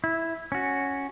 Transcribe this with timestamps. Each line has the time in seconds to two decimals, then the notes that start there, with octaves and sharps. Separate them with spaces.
0.04 E4
0.52 C#4 F#4